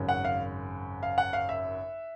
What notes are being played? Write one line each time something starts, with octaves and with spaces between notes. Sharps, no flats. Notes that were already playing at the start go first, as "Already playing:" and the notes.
Already playing: G#1 F#2 C#3
F#5
F5
F5
F#5
F5
E5